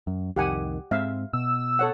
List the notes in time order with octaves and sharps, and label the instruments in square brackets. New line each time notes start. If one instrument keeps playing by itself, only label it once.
[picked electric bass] F#2
[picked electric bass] C2 F2 D#3 [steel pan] G4 F#5 G#5
[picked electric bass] G#2 G#3 C4 [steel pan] E5 F5
[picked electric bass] B2 [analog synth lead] E6
[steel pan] A4 C#5 F#5